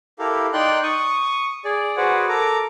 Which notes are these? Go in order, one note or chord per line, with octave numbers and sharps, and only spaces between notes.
E4 G4 A4 A#4 F5
D#4 D5 G5 C6 F#6
C#6 D#6
G#4 D5
F#4 G#4 B4 C5 D5 F#5
A4 A#4 A#5 D6